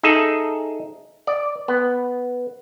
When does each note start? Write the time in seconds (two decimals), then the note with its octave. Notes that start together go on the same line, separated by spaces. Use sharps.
0.03 D#4 G#4 A4 E5
1.27 D5
1.68 B3